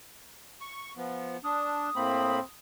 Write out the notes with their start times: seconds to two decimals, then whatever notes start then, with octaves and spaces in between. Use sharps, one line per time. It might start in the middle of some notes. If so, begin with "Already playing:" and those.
0.61 C#6
0.97 F3 B3
1.44 D4 D#6
1.96 A2 A#3 C4 B5